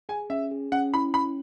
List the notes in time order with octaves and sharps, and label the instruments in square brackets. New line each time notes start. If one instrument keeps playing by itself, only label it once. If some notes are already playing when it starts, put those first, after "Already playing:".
[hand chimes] G#4 [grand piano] G#5
[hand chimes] C#4 [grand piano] E5
[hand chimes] G#4
[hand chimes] C#4 [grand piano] F#5
[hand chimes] E4 [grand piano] B5
[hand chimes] C#4 [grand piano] B5